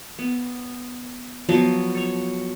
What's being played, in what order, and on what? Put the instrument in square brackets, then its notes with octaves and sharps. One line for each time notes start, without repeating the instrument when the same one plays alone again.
[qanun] B3
F3 F#3 B3 F#4
A4 C#5